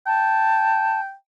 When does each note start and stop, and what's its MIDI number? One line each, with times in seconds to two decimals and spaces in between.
0.07 1.13 79
0.07 1.00 81